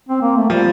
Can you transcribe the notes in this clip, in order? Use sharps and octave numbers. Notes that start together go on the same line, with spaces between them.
C4
A#3
A3
F3 G3